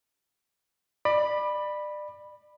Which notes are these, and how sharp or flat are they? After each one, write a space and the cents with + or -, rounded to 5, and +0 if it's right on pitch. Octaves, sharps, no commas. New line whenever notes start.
D5 +30 B5 -5